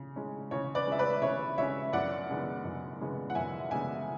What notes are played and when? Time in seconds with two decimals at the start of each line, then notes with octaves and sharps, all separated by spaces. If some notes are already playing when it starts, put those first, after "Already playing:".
Already playing: C#3
0.16 G#3 C#4
0.51 C#3 C#5
0.75 B4 D5
0.87 G#3 C#4 E5
0.98 B4 D5
1.22 C#3 C#5 E5
1.58 G#3 C#4 C#5 E5
1.93 F#2 D5 F#5
2.29 C#3 G#3 B3 D4
2.64 F#2
3.00 C#3 G#3 B3 D4
3.30 F#5
3.35 F#2 E5 G#5
3.71 C#3 G#3 B3 D4 E5 G#5